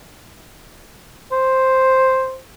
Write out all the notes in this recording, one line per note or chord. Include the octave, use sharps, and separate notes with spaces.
C5